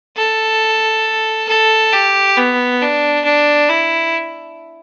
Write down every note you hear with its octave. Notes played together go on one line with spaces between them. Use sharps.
A4
A4
G4
B3
D4
D4
E4